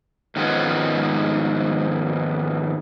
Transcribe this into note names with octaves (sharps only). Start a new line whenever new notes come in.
G#2 D#3 F3 G#3 B3 C#4